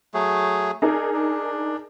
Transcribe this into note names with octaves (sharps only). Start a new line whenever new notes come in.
F#3 A3 G#4
D4 D#4 G#4 A#4
D4